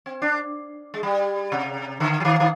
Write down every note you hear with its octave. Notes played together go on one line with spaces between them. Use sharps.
C4
D4
G#3
G3
C3
D3
F3
D#3
D#3